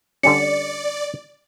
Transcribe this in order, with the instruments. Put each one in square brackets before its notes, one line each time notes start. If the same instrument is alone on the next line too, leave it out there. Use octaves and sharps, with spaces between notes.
[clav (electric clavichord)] D3 G3 C#4 [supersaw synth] D5 [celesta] C#7